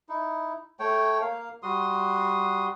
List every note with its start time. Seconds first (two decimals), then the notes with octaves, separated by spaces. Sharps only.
0.09 D#4 E4
0.79 A3 C#5 G5
1.21 A#3 F5
1.63 G3 F#4 C6 D#6